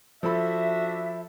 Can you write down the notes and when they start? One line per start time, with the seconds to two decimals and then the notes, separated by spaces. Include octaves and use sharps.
0.23 F3 D4 F#4 A4 E5 B5